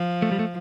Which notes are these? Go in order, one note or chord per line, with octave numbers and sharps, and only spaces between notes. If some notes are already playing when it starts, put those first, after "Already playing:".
Already playing: F3
A3
G3
A3